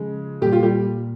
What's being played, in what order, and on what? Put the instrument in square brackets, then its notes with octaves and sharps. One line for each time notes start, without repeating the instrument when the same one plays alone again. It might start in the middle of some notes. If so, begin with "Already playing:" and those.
Already playing: [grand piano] C#3 F3 G#3
A#2 G3 G4
F4
G3 G4